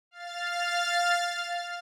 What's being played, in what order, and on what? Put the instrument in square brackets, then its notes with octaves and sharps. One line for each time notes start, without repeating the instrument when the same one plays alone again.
[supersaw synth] F5 F6 A6